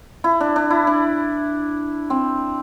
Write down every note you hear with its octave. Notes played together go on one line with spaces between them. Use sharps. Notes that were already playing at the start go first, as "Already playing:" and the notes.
E4
D4
D4
E4
D4
C4